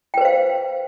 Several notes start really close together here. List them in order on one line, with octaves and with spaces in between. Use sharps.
G5 B4 C5 F5